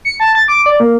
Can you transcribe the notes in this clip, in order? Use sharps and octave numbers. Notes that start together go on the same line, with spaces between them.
C#7
A5
A6
D6
D5
A#3